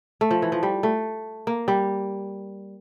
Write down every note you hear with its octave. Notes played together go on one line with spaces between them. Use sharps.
A3
F3
E3
F3
G3
A3
A#3
G3